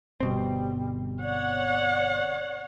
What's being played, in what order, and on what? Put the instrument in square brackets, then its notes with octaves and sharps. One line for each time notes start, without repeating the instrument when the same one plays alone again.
[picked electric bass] G1 B2 C4 [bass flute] G3
[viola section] C#5 F#5 [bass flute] D5